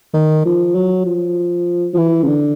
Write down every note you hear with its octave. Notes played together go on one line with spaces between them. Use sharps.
D#3
F3
F#3
F3
F3
E3
C#3
D3